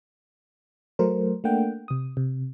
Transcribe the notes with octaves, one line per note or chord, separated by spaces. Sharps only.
F#3 A3 A#4 C5
A3 A#3 D4 F#5 G5
C3 D#6
C3